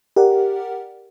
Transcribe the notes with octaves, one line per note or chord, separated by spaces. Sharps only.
G4 A#4 D5 F#5